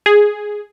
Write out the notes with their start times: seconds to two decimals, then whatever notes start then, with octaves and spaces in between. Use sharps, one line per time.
0.06 G#4